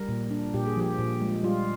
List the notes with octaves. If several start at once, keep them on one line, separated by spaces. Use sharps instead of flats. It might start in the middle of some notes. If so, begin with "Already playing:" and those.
Already playing: G3 A#4
A#2
D4
A#2 G4
G#4
F3 G4
A#2
G#3
G3 F4